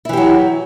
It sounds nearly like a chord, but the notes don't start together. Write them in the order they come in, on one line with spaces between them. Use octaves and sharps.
E4 E3 G4 F#3